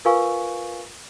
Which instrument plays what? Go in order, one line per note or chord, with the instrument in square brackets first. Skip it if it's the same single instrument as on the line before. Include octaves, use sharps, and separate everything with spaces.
[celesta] F4 A#4 B4 F5 G#5 C#6